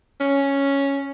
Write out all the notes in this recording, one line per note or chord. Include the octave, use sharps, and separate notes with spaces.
C#4